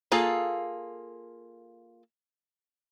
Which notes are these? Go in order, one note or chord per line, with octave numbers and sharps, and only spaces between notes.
A#3 F4 G#4 A4